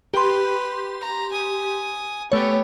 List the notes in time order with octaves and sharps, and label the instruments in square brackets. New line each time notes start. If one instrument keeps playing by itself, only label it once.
[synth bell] G4 C6 [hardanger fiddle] B4
[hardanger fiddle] A#5
G#5 D#6
[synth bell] A3 C#5 [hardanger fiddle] B3 G4